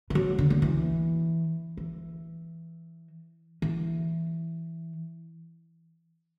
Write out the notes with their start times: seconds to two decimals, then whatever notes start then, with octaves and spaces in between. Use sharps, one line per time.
0.10 E3
0.15 F#3
0.39 D3
0.50 D3
0.62 E3
1.77 E3
3.62 E3